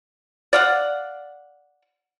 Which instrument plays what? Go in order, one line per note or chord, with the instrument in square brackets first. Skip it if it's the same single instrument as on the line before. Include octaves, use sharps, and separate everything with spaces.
[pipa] D5 F5 F#5